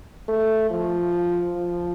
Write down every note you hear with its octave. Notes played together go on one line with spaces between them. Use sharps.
A3
F3
F3